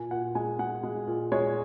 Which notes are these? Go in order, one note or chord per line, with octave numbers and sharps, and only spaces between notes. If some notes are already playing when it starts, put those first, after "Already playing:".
Already playing: A#2 G#5
A#2 F#5
G#3 G#5
G#3 F#5
G#3
A#2
G#3 C#5